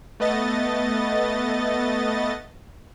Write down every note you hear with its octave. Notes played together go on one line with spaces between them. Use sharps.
A3 B3 D#5 A6